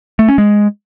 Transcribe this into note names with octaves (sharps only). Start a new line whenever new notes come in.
A3
C#4
G#3